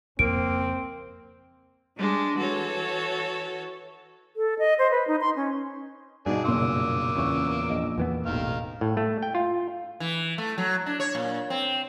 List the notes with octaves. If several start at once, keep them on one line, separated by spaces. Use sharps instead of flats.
F2 C#3 A#3 C4 D7
G3 G#3 D4
E3 F#4 A4 C#5
A4
D#5
C5
B4
D#4
C6
C#4
G2 B2 D4 D#4 F#4 G#4
F#1 A#2 A#3 C6 D6 E6
E2 A#2 C#3 C#6
A#1 D#5
E2 E3 B3
E1 A1 D#3 F5
A2
A3
G5
F4
E3
A3
F#3
D4
C#5
A#2
C4